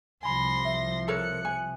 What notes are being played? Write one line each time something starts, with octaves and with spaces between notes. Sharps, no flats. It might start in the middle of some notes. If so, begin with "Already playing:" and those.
C2 F3 G#5 B5 C6 A#6
E5
A4 A#4 C#5 F#6 C#7
G#5